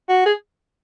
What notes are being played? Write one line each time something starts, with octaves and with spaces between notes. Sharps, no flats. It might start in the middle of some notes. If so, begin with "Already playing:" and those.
F#4
G#4